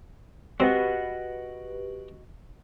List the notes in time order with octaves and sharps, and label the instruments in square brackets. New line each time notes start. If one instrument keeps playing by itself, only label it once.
[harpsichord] C4 [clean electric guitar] F#4 D#5 F#5 [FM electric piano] G4 B4